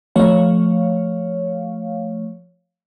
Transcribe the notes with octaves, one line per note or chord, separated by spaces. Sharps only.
F3 A3 C#5 F5